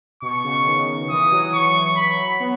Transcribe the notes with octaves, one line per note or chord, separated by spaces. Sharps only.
B2 C#6
C#3
D#3
E3 D#6
F#3
C#6
B5
B3